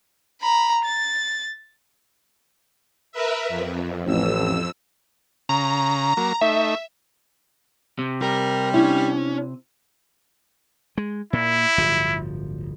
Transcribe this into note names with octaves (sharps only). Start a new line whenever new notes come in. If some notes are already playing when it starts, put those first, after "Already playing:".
A#5 B5
A6
A#4 B4 E5
F2
A1 F2 A2 E6
C#3 A#5
F#3 A#3
A3 D#4 E5
C3
G3 A#4
C#4 D4 E4
G#3
A#2 E4
D1 G1 F3